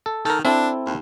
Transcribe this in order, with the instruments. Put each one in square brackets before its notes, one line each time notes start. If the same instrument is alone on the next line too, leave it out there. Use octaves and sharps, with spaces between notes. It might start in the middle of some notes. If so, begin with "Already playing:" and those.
[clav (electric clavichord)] A4
[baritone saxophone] D#3 [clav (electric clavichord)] A4 A#4
[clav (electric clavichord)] C4 E4 A4 [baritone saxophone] D4
[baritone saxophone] D#2